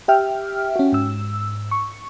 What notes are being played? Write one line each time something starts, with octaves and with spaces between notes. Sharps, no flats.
G4 E5 G5 F6
C#4 F#4
G#2 E6
C#6